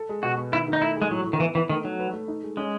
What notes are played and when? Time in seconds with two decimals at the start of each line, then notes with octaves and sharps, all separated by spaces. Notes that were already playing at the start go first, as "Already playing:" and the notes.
Already playing: A4
0.09 G#3
0.23 B2 F#4
0.37 B3
0.52 D#3 E4
0.68 D#3
0.73 D#4
0.82 A3 E4
0.96 G#4
1.02 G#3
1.11 A2 F#3
1.25 A2
1.33 D#3
1.40 E3 B3
1.55 E3 B3
1.70 D#3 A3
1.84 F#3 D#4
1.99 B4
2.13 A3
2.28 D#4
2.43 G#3
2.57 G#3 C#4